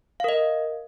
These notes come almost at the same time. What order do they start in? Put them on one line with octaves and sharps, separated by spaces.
F5 A#4 D#5